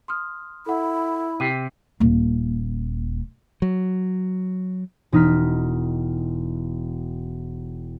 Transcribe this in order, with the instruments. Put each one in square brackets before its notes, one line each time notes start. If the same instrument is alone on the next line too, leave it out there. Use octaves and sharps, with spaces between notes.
[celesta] C6 D#6 F6
[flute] E4 [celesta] A4 F#5 [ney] B5
[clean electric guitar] C3 [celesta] G4 G5 D#7
[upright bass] D#1 A#3
[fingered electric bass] F#3
[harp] E1 D#4 F6 B6